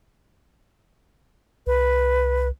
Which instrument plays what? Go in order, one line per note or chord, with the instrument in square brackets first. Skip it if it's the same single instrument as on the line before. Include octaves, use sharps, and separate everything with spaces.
[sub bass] C2 [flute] B4